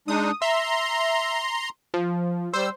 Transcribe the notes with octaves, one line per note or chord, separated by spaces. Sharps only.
G#3 D4 D#4 D#6
E5 A#5 C6
F3
G3 C5 E6